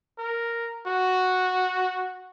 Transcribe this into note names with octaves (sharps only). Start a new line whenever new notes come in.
A#4
F#4